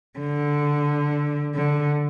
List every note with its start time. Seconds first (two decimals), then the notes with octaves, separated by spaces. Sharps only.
0.19 D3
1.55 D3